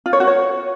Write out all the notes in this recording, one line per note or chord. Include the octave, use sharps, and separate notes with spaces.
F4
C#5
F#4
C#5